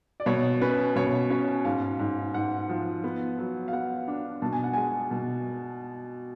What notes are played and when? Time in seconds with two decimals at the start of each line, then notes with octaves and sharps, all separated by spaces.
0.20 D5
0.26 B2 C#5
0.61 C#4 B4
0.96 B2 C#5
1.30 C#4 C#5
1.65 G#2 F5
1.99 G#2
2.34 G#2 F#5
2.69 F3
3.04 B3
3.39 F#3
3.68 F5
3.73 B3 F#5
4.08 D4
4.42 B2 A5
4.53 G#5
4.64 F#5
4.73 G#3 G#5
5.11 B2